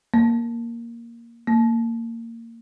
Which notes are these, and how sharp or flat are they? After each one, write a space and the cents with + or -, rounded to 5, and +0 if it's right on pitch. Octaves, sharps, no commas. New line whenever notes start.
A#3 +0
A#3 -20